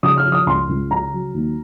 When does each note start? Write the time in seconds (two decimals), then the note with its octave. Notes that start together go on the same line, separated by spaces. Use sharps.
0.03 C#3 D#6
0.17 F6
0.25 F3
0.32 D#6
0.47 C#2 C6
0.69 C#2
0.91 C#3 A#5
1.13 F#3
1.34 D#2